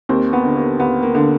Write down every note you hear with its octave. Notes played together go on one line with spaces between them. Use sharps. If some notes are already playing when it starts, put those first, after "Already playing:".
D#2 A#3 C4
B3
D3
A#3
D#2 B3
A#3
D3